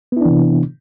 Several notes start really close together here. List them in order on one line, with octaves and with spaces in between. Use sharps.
B3 E4 D4 E3 C3